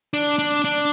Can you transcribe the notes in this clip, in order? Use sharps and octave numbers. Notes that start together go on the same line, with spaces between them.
D4
D4
D4